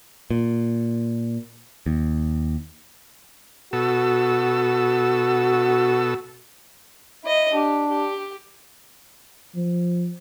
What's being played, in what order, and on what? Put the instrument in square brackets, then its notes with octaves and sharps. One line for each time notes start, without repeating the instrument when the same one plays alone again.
[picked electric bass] A#2
D#2
[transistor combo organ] B2 A4 E6 [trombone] F#4
[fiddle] E4 D#5
[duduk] D4 [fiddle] G4
[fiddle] G4
[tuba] F3